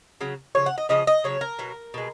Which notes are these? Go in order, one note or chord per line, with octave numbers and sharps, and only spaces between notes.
C#3 F#3
C#3 F3 C#5
F#5
D#5
C#3 F3 D#5
D#5
C#3 F#3 C#5
A#4
B2 F#3
B2 G#3